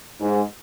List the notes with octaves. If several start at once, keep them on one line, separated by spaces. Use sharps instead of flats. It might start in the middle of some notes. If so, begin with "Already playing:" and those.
G#2